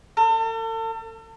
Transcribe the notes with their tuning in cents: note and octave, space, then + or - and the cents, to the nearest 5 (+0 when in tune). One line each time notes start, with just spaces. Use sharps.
A4 +40